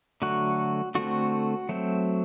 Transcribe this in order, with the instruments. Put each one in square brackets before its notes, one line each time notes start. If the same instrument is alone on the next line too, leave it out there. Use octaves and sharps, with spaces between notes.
[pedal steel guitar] D3 F#3 A3 F#4
D3 A3 C4 F#4
F#3 A3 C4